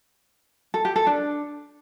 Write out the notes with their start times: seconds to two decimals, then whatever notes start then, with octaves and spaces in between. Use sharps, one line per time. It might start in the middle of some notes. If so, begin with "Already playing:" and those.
0.74 A4
0.85 G4
0.96 A4
1.07 D4